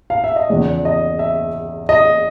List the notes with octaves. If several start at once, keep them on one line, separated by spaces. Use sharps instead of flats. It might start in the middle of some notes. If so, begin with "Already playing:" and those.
F5
E5
D#5
E2 C#3 F3 G#3 D5
D#5
E5
D#5